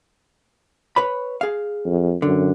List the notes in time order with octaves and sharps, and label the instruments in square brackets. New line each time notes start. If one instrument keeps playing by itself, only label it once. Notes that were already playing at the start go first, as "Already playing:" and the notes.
[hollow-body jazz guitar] B4 C#5 B5
G#4 F5
[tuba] F2
[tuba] F#2 [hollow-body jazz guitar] D3